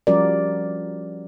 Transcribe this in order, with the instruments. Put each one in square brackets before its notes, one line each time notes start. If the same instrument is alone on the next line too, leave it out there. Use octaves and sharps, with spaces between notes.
[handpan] F3 G3 C#4 F#4 A#4 D5